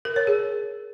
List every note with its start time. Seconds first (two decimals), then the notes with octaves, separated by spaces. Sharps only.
0.05 A#4
0.16 C#5
0.27 G#4